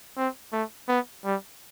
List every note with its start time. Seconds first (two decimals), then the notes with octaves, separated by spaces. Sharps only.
0.17 C4
0.52 A3
0.88 B3
1.25 G3